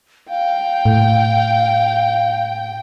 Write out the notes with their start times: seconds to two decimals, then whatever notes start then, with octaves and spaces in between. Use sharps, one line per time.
0.30 F5 G5
0.86 A2